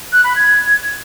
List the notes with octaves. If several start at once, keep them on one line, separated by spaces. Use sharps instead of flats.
F#6
B5
G#6